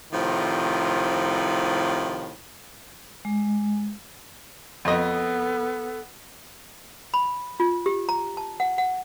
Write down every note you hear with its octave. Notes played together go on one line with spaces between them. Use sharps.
A2 C3 D#3 F3
G#3
F2 B3 A4 D#5
B5
F4
G4
A#5
A5
F#5
F#5